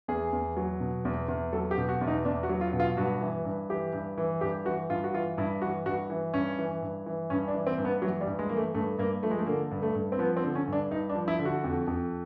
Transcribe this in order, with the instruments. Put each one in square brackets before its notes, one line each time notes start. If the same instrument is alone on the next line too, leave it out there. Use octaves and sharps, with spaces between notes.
[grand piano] E2 G#4
E2
F#3
B2
E2
E2
F#3 A4
G4
B2
F#4
E2
D#4
E2 D4
F#4
F#3
F4
B2
F4
G2 F#4
E3
G2
E3 G4
G2
E3
G2 G4
E3 F#4
G2 F4
F#4
E3 F4
G2 E4
E3 F#4
G2 F#4
E3
G2 C#4
E3
G2
E3
G2 C#4
D4
E3
C4
G2
B3
E3 F#3
G3
G2
G#3
E3 A#3
A3
G2 A3
G2 A#3
F3 A3
G#3
A3
D3 A#3
G2
A3
G2
C4
F3 B3
C4
D3
C#4
G2
D4
G2 D#4
D4
F3
E4
D3
F#4
F2
F2